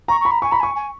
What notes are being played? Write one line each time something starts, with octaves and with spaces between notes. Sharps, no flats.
A#5 C#6
C#6
B5
A#5
G#5 C#6
A#5 B5
G#5 C#6
G#5